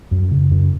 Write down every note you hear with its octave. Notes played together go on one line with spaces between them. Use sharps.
F#2
C#3
F#2